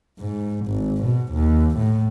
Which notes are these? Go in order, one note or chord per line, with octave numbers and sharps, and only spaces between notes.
G#2
G#1
B2
D#2
A2